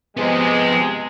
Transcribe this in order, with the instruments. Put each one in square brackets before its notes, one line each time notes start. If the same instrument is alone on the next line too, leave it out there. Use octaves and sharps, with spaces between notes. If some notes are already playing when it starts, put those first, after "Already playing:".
[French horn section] C3 G#3 [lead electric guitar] F3 B3